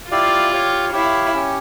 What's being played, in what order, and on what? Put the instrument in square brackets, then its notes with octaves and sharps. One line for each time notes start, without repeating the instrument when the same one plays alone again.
[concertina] E4 G4 D5 F5 [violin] F4
[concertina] G4 C#5 F5
[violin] E4 [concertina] G4 C#5 F5
[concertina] C#4 G4 C#5